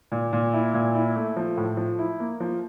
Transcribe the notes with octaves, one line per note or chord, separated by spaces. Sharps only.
A#2
A#2
E4
A#2
E4
A3
F3
A2
F3
E4
A#3
F3